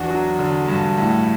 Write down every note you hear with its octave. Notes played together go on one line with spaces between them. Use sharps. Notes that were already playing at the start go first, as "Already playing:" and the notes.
Already playing: E2 D4 F#4
F#3
D3
G2
A2